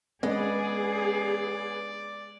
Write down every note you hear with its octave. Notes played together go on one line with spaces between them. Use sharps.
G#3 B3 C#4 D4 G#4 D5